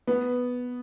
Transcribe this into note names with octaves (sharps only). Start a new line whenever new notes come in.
B3